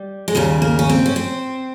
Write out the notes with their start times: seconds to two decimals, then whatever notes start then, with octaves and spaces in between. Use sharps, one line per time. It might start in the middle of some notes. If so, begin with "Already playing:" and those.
Already playing: G3
0.28 G#3
0.35 D#2 C#3 G3
0.62 A#3
0.79 C#4
0.89 C4
1.06 C#4
1.16 C4